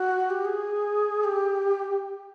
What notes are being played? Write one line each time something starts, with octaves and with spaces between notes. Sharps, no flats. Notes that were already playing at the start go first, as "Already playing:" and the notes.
Already playing: F#4
G4
G#4
G4